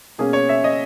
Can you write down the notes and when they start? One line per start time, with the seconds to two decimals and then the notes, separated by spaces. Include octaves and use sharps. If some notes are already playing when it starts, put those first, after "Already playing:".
0.18 B2 A#3 C#4 G#4
0.33 C#5
0.49 E5
0.64 D#5